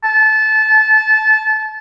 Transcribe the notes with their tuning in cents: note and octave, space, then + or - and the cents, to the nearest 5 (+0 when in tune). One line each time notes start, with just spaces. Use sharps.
A5 -20